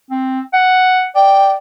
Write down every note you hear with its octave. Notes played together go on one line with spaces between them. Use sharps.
C4
F#5
D5 G5